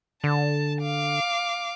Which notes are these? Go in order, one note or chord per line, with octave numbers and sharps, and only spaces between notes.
D3 A5
F5 D6